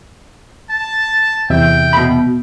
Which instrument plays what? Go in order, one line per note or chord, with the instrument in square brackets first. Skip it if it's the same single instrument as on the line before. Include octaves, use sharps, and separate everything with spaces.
[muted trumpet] A5
[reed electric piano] E2 C3 E5 [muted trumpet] G5
[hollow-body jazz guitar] B2 B5